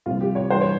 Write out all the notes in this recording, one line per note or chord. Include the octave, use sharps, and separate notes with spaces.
C2 C3 F3 F4
G4
C#5
G2 E3 C5
C#5